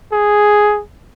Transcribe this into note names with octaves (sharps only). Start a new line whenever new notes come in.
G#4